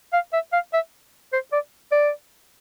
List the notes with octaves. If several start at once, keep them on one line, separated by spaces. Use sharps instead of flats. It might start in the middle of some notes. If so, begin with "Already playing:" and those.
F5
E5
F5
E5
C5
D5
D5